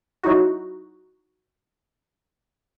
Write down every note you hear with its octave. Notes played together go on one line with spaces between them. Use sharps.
F#3 D#4 E4 F#4